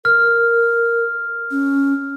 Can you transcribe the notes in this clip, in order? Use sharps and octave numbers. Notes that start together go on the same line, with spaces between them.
A#4 F6
C#4